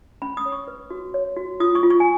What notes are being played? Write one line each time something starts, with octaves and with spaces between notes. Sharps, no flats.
C#4 B5
D#6
C#5
C#6
B4
F#4
C#5
F#4
F4 D#6
C#6
F4
C#6
G#5